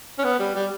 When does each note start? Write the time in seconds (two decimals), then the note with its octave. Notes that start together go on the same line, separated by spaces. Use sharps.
0.18 C#4
0.24 B3
0.39 G3
0.55 G3